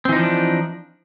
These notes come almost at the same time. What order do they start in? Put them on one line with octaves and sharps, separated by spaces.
C4 E3 D#4 F3 D4